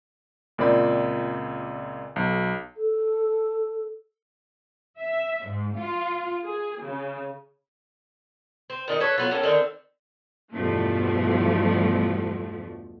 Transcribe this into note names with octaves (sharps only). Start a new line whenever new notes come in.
C#2 A#2 C4 D5 B5
B1
A4
E5
G#2
F4
G#4
C#3
C4
A#2 D#3 A4 D#5
A4 B4 C#5
F#3 B3 F4
A2 C#4 A4 A#4
D3 D#3 C4
E2 G2 B2 F3 A3